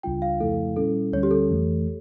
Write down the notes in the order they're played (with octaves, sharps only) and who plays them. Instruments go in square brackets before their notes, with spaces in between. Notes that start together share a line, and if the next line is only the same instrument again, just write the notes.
[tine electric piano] C#2 C#3 G3 D4 F4 [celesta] G5
[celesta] F5
[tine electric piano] F2 C#3 F3 A3 E4 [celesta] A4
[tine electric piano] A#2 G3 C#4 E4 [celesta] A4
[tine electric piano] D2 D3 G3 C#4 [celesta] C#5
[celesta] G4
A4
[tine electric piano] F2 E3 A3